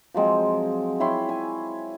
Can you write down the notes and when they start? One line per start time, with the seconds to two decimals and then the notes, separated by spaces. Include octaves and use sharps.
0.14 F3 F#3 G#3 C4
1.00 E4 C#5 G5 C6
1.29 G#5